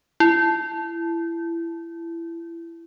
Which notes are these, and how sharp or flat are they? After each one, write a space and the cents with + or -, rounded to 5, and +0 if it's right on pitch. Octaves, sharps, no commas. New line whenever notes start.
E4 +25